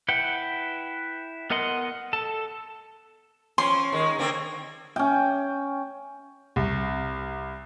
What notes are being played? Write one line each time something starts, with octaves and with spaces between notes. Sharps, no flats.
E4 B4 F#5 G5
B3 A#4 D#5 F#5 C6
A4 A5
F3 C#4 C6
D#3 G#3
D3 A#3 C4
C#4 G5
C2